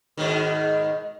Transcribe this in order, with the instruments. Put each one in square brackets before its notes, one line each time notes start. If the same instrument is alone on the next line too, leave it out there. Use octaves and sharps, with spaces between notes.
[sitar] G#2 B2 D#3